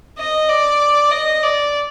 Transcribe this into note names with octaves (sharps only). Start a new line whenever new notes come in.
D#5
D5
D#5
D5